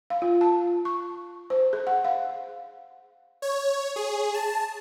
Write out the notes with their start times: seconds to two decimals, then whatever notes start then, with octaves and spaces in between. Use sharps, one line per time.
0.10 F5
0.22 F4
0.41 A5
0.85 C#6
1.50 C5
1.73 G#4
1.87 F#5
2.05 F5
3.42 C#5
3.96 G#4
4.34 A5